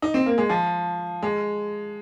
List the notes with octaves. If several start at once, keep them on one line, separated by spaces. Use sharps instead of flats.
D#4
C4
A#3
G#3
F3
G#3